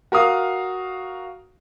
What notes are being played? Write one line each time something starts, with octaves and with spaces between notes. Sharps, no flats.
F#4 A#4 F5 D#6